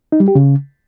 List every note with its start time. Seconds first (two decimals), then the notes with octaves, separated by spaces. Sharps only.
0.12 D#4
0.20 G3
0.28 G4
0.35 C#3